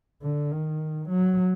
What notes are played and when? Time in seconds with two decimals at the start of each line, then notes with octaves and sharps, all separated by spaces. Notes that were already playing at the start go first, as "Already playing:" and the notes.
0.22 D3
0.52 D#3
1.09 F#3